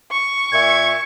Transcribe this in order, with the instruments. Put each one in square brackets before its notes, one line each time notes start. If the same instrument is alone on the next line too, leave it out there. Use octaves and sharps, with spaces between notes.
[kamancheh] C#6
[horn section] A#2 E5 [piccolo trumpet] G#6